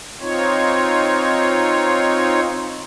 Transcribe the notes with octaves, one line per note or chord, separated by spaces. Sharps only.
C4 D#4 F4 C#5